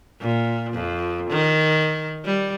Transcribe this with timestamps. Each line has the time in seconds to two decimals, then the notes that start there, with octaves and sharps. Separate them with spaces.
0.21 A#2
0.73 F2
1.30 D#3
2.25 G3